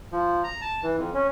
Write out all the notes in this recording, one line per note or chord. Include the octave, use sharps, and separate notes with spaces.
F3
A#5
A5
E3
F2
C#4